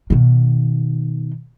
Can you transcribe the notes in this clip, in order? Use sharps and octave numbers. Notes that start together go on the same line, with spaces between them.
B2 D#3